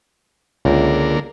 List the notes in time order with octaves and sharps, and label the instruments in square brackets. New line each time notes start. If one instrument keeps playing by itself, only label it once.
[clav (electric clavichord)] C#2 [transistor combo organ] D3 A#3